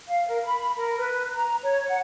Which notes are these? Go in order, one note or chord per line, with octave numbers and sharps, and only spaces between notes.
F5
A#4
B5
B5
A#4
B4
A#5
C#5
F#5